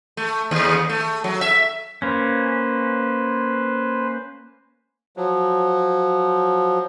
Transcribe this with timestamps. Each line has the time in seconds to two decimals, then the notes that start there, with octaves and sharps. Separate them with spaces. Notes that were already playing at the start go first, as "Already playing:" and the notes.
0.17 A3
0.51 D#2
0.89 A3
1.24 F#3
1.41 E5
2.02 A#3 C#4 B4 C5
5.17 F3 F#3